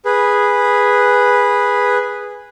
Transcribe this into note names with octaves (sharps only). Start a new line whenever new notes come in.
G#4 B4